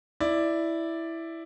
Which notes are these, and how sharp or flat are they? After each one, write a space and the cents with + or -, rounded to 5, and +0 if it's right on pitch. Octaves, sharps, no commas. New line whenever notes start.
E4 +0 D5 +0